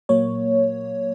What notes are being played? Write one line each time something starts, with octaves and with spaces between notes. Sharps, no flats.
A#2 F#3 A#3 C#5